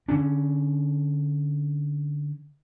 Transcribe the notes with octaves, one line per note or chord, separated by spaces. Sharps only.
D3 C#4 D4